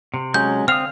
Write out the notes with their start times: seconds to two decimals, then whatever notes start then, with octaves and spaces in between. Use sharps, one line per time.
0.14 C3
0.34 F#3 G#3 C#4 G6
0.68 D3 C4 F5 D#6 F6